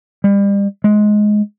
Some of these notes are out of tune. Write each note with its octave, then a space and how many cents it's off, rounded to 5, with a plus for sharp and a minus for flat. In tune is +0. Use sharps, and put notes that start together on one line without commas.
G3 +35
G#3 +15